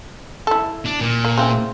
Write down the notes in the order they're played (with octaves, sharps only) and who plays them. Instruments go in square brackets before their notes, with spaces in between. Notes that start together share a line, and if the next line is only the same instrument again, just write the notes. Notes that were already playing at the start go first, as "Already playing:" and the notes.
[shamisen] E4 A4
[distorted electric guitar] D4
A#2
[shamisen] A#3
C#3 E3 C4